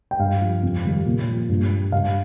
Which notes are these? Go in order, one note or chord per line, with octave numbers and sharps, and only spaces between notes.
G5
G2 F5
F3
F2
D#3 G3
A#2
F3
G2
G3
G2 F5